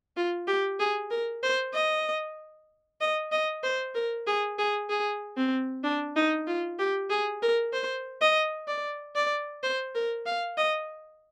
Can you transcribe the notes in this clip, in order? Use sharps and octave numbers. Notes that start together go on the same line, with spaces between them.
F4
G4
G#4
A#4
C5
D#5
D#5
D#5
C5
A#4
G#4
G#4
G#4
C4
D4
D#4
F4
G4
G#4
A#4
C5
D#5
D5
D5
C5
A#4
F5
D#5